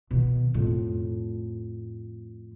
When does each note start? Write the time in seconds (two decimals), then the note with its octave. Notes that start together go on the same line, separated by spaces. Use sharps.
0.11 B2 D#3
0.54 F2 A2